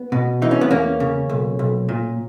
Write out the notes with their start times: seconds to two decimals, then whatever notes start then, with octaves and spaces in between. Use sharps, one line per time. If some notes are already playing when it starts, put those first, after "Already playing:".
Already playing: B3
0.12 B2
0.42 E3 D#4
0.51 C#4
0.61 B3
0.70 E2 A#3 C#4
1.00 C#3
1.29 B1
1.59 B1
1.89 A#2